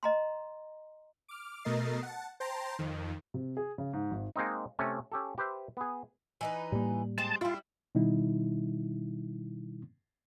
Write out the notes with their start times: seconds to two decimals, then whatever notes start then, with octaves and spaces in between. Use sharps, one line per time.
0.03 D#5 A#5 C6
1.28 D6 F6
1.64 B2 A3 A#4 D#5 A6 C7
2.03 F#5 A5
2.40 C5 G5 A5 A#5 C6
2.79 F2 D#3
3.34 C3
3.57 G#4
3.78 C#3
3.93 G#2
4.11 G#1
4.36 G#3 A#3 C4 D#4
4.79 C3 A3 C#4
5.12 C#4 G4 A4
5.38 G4 B4 C5 E5
5.77 B3 G#4
6.41 E3 D#4 B4
6.72 A2 G3 A#3
7.18 G#3 C4 A5
7.41 G3 E4 F4
7.95 B2 D#3 G3 D#4 E4